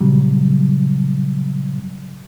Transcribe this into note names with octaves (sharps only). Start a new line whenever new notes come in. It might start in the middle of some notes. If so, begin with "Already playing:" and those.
A#2 C#3 F#3 G3